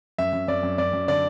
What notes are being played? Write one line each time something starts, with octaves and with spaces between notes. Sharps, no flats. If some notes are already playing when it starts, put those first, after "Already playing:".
F#2 E5
F#2
F#2 D5
F#2
F#2 D5
F#2
D3 D5